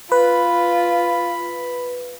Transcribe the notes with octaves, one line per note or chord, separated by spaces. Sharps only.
F4 B4 B5